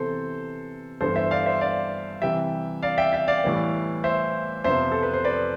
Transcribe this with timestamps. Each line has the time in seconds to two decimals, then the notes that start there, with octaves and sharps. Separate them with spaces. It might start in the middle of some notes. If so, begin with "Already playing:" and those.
Already playing: C3 E3 B3 A4 C5
1.01 G2 E3 B3 A4 C5
1.16 C5 E5
1.31 D5 F5
1.46 C5 E5
1.61 D5 F5
2.22 C3 E3 G3 E5 G5
2.83 D5 F5
2.98 E5 G5
3.13 E5 G5
3.28 D5 F5
3.44 A2 E3 G3 B3
4.04 C5 E5
4.64 F2 C3 F3 B3 C5 E5
4.92 A4
5.03 B4
5.13 C5
5.25 B4 D5